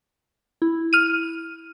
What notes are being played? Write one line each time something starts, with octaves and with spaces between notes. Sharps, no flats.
E4
F6 D#7